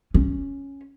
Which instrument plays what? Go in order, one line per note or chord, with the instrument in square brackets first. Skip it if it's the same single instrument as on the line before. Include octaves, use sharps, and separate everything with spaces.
[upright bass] C#4